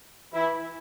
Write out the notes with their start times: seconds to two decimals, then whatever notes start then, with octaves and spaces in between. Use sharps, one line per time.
0.34 E3 E4